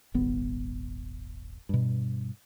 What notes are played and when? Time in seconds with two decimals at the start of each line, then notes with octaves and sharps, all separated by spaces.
0.14 D#1 G#1 D#2 B3
1.69 G2 B2